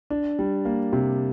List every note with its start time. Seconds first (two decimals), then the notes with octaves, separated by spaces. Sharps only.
0.10 D4
0.39 G3
0.65 A#3
0.93 C3